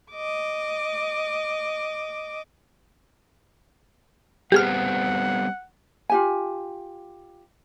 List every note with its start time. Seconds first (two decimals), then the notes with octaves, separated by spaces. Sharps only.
0.12 D#5 D6
4.52 G3 B3 C4 G4 G#4 F#5 F6
6.10 F4 G4 G#5